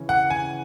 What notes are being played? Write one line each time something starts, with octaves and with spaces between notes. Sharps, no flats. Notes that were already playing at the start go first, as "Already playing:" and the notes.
Already playing: C#3 E3 C#4
F#5
G#5